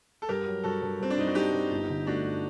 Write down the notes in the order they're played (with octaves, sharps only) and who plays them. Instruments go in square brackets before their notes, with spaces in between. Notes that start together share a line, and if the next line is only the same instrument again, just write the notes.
[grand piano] A4
[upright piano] G2 [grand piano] G4 A#4
[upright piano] F#3
[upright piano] G2 [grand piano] F#4 A4
[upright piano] G2
[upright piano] G2 [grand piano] C4
[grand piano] D4
[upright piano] G2 [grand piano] D#4
[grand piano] F#4
[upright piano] G2 [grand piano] D#4 G4
[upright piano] G2
G1
D3
[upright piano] A3 [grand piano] D4 F#4
[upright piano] G1